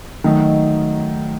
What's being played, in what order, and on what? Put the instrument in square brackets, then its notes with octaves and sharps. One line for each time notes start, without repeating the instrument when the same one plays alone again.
[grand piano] D#3 [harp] F#3 A3 D#4